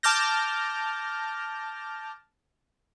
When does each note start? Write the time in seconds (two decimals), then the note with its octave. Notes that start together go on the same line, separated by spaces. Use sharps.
0.03 A5 D6 F6 G6 A#6